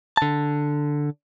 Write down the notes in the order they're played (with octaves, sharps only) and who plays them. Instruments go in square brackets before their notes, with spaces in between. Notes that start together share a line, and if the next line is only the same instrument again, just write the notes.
[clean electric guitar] D3 A5